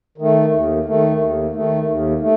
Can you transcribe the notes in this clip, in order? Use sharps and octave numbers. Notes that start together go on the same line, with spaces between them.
D#3 A3
D#2
D#3 A3
D#2
D#3 A3
D#2
A3